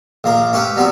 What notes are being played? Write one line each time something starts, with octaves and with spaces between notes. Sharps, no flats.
A#1 A#3 A#4
C#4 G4 B4 E5
F#3 G3 B3 C4 F#4